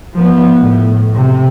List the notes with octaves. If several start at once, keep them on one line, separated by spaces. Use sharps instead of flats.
F3 B3
A2
C3